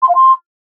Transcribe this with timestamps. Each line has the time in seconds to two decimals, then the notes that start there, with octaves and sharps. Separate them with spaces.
0.02 C6
0.09 F5
0.15 C6